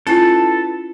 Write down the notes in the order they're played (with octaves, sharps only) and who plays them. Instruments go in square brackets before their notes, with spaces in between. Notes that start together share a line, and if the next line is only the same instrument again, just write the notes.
[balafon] C#4 F4 [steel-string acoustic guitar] E4 B4 A5 [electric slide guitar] A4